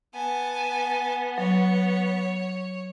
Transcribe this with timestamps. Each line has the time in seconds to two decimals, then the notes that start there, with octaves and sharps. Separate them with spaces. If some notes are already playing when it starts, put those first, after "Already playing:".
0.15 B3 G#5 A5
1.38 F#3 C#5